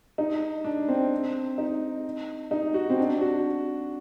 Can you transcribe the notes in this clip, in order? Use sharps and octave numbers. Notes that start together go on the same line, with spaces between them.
D#4
D4
C4
D#4
D#4
F#4
C4
D4
F#4